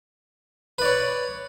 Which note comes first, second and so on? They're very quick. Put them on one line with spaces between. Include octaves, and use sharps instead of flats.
B4 D5 C#5